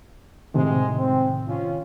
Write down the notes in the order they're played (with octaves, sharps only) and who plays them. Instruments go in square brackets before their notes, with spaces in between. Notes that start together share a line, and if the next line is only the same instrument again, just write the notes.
[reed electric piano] A2 C3 D#3 [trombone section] G#3 C4
[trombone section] C4
C#4 F4